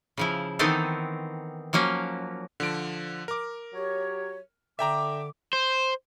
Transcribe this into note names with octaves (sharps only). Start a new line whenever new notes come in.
C#3 F3 E4
D#3 E3 B3 C4 D#4 A4
F3 F#3 A#3 C#4
D3 F3 D7
A#4 D6
F#3 G4 C#5
D3 E5 G5 A#5 D6
C5